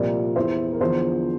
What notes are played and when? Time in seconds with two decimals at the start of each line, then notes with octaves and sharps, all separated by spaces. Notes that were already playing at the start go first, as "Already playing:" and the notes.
Already playing: C2 A#2 F3 A#4 D5
0.36 E2 E3 C5 E5
0.72 A#4
0.80 E2 D3 F3 C5